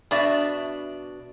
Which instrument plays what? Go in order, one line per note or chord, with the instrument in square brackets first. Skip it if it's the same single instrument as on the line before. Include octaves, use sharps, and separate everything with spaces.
[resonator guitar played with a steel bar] B2 D4 D5 E5